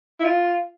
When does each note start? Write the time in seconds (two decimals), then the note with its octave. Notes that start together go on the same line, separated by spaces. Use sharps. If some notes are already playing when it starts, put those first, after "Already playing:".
0.20 E4
0.24 F4